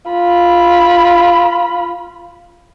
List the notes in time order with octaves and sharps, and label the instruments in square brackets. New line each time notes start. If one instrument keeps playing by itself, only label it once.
[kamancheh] F4 B5